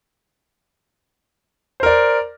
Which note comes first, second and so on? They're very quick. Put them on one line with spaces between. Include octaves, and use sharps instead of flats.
C5 A#4 D5